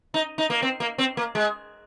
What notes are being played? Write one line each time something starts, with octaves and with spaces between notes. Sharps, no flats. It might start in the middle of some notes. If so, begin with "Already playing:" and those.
D#4
D#4
A#3
C4
A#3
C4
A#3
G#3